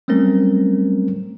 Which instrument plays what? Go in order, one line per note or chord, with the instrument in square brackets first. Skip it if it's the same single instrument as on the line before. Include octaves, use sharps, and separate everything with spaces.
[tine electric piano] F#3 G3 A3 C4 C#4 A#4